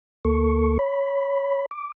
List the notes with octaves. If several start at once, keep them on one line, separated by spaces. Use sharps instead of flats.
D2 A#3 A4 C#6
C#5 B5
D6